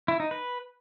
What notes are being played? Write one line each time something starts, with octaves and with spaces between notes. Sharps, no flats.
E4
D#4
B4